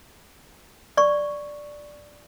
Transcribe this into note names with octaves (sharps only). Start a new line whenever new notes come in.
D5 C#6